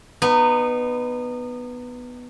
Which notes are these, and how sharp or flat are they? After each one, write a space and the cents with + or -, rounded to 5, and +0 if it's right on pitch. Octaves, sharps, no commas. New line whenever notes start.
B3 +0 D#4 -30